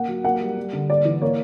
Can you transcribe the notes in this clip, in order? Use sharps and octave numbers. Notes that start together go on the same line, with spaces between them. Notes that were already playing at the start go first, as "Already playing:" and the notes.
Already playing: A#3 F#5
F#3
A#3 F#5
G3
G3
D3
A#3 D5
E3
A#3 C#5